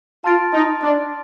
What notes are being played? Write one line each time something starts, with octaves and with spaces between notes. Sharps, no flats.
F4 A5 C6 F6 A6 D7
D#4
D4